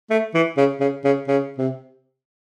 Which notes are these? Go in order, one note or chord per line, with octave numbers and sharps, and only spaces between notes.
A3
E3
C#3
C#3
C#3
C#3
C3